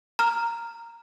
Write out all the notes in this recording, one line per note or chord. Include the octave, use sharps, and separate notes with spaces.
A#5 F6